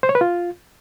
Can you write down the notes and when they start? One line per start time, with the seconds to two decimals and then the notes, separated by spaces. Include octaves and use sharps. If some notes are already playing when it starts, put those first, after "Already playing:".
0.03 C5
0.09 C#5
0.15 B4
0.21 F4